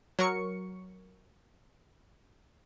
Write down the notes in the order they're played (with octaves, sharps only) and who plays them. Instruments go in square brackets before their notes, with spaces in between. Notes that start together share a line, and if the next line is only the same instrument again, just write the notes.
[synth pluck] F#3 A#4 C#6 C#7